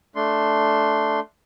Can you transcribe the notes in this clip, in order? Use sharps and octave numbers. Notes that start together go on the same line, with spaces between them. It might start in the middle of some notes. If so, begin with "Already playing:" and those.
A3 D4 C6